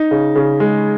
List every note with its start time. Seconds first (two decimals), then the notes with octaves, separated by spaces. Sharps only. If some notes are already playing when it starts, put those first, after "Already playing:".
Already playing: D#4
0.11 C#3
0.35 C#3
0.60 G#3